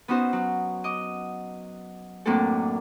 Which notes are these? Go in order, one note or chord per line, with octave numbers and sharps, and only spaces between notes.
B3 C#4 D#4 F#4 C5
F#3 C#5
D#5 D6
F#2 A2 A#3 C4 D4 A4